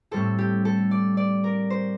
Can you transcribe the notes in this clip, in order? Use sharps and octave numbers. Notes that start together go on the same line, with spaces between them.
A2 G3 C4 A4
G4
A4
D5
D5
A#4
C5